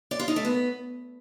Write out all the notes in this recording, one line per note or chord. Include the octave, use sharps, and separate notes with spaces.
D5
F4
D#4
A3
B3